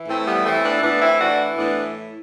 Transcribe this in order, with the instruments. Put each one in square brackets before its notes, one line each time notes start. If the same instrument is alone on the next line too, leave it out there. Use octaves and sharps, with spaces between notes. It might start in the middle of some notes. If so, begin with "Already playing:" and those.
Already playing: [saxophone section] E3
A2 A3 C4
G3 B3
E3 A3 C4
B3 D4
E4
A2 B3 D4
C4 E4
E3 D4 F#4
A2 B3 D4